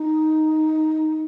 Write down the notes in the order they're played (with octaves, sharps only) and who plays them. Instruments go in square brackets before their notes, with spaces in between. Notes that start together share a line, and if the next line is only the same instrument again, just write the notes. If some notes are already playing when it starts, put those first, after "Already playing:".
Already playing: [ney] D#4